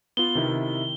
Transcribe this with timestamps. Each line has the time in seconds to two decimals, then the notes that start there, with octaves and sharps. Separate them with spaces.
0.17 B3 F4 G7
0.35 C3 D#3 E4